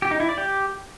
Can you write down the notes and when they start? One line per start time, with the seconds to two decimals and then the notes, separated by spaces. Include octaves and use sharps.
0.02 G4
0.11 D#4
0.20 E4
0.29 D5
0.38 G4